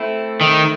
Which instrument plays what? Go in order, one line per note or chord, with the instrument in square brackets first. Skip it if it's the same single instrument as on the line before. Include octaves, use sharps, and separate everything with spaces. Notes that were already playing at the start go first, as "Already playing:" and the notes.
Already playing: [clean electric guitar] A3 C4 E4
[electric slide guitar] D#3